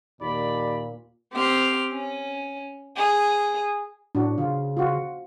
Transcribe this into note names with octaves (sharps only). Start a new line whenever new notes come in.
D#2 A#2 D5 B5
C4 G4 F6
C#4
G#4
A2 D4 F#4
C#3 F4
F4 F#4